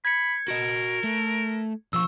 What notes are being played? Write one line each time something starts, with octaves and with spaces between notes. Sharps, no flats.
B5 G#6 C#7
F#4 A#4 D#5
A3
B1 F3 C#6 E6